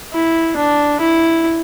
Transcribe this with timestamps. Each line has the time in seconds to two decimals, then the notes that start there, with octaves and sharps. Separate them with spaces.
0.14 E4
0.57 D4
1.01 E4